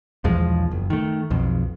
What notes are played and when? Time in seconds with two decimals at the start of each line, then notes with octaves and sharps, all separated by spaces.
0.24 B1 E2 F3 G#3
0.71 F#1
0.90 D#3 A3
1.30 B1 F2